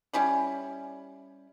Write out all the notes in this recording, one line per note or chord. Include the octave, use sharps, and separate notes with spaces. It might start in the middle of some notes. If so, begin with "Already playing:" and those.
G3 C#4 E4 B5